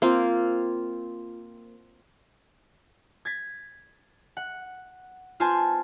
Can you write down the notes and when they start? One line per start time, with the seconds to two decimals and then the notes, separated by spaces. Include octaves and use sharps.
0.02 A#3 C4 F4
3.25 G#6 A6 B6
4.37 F#5
5.40 B3 F4 C5 G#5 A5